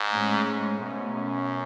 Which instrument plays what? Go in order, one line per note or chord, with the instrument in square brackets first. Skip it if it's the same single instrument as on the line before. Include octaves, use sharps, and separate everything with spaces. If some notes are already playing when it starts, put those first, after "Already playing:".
Already playing: [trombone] G#2
[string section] A2 G#3 C#4
[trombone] G#2
[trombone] G#2 [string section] B2 A3 C#4
[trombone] F#2